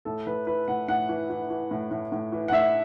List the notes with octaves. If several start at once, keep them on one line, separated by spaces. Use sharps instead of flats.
A2 A4
A2 B4
E3 B4
A2 F#5
A2 F#5
E3
E3
E3
A2
A2
A2
E3
F#5
A2 E5